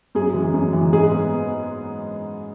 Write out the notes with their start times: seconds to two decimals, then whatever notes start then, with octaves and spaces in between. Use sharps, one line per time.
0.15 F#2 G#4
0.34 E3 G#3
0.54 F#2
0.73 E3 G#3
0.93 G#2 G#4
1.11 G#3 B3